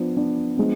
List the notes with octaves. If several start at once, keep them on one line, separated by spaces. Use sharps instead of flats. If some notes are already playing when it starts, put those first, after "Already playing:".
Already playing: F3 B3 D4
F3 B3 D4
F3 G#3 B3 D4